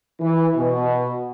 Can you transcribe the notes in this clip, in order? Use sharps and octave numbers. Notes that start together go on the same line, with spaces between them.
E3
B2